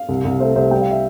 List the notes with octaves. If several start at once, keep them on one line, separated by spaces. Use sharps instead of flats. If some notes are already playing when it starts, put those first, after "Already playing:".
Already playing: F5
C2
C2
A3 C5 E5
C2 C5 E5
G3 G5
F5
E5